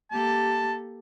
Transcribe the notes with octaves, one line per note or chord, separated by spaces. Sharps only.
A#3 G4 A4 A5